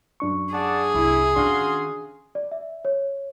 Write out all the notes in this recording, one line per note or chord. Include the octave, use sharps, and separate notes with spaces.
F#2 D4 C#6
G#4 D5 F#5 A5
C2 E4
D#3 C#4 D4 F#4 F5 C6
D5
E5
C#5